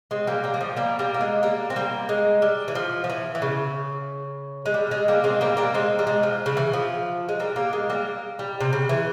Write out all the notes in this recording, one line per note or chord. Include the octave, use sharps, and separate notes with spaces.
G#3 C4
G3 A#3
G3 A#3
G3
F3
G3 A#3
G3 A#3
A#3
G#3
G3 A#3
C4
G3 A#3
G#3
G3
E3
F3
F3
E3
E3
C#3
G#3
G3
G#3
G3 A#3
G#3 C4
G3 A#3
G3 A#3
G#3 C4
G3
G#3
F3
C#3
E3
F3
G#3
G3 A#3
G3 A#3
G#3
G3 A#3
G3
C3
C#3
E3